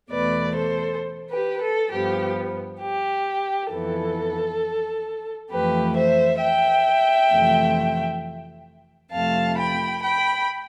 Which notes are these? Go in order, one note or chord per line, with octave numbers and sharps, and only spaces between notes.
E2 B2 A3 B4 D5
A4 C5
G4 B4
A4
G2 F3 B3 G4
G4
F2 E3 B3 A4
F2 E3 A3 G4 B4
C5 E5
E5 G5
F2 C3 E3 A3
F2 C3 F3 A3 F5 A5
G5 B5
G5 B5